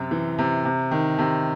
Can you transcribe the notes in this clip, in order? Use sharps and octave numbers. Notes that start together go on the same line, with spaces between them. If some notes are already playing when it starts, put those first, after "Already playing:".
Already playing: F#2 C3
E3
C3
C3
D#3
C3